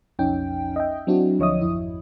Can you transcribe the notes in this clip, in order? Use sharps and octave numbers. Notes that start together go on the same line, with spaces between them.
B1 F2 C#4 D#4 G5
D#5 E5 G5
F#3 C4 D4 E4 F#4
D2 F3 C#5 D#5 E5 D#6
G#1 F2 E4